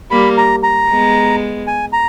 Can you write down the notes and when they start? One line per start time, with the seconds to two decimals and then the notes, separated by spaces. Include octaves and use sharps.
0.11 G3 A#3 B5
0.38 A#5
0.63 A#5
0.89 G#3 B3
1.67 G#5
1.93 A#5